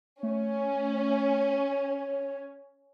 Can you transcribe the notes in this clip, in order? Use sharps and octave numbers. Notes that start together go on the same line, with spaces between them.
A3 C#4
C#5